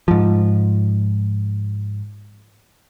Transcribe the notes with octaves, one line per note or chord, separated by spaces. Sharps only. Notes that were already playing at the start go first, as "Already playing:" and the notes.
G#2 F3